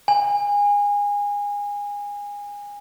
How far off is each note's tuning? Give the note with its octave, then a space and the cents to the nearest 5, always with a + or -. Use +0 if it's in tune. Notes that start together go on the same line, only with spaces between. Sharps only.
G#5 -25